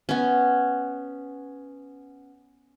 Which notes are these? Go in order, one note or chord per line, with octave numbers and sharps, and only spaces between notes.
B3 C#4